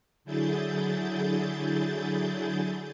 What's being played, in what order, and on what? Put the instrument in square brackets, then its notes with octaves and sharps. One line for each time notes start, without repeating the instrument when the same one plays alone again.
[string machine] D3 F#3 E4 G#4 G6 A6